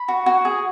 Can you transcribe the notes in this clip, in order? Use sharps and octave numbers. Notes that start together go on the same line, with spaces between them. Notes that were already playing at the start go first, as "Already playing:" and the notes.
Already playing: B5
F#4
F#4
G#4